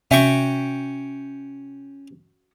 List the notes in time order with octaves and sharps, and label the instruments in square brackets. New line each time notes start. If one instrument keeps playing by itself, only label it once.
[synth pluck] C3 [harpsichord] C#4 G5 C#6 [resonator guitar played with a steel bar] F#4 E5